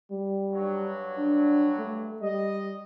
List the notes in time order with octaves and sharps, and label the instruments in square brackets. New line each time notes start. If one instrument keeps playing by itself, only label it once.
[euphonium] G3
[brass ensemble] G2 F#3
[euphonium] D4
A3
[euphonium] G3 [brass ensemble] D#5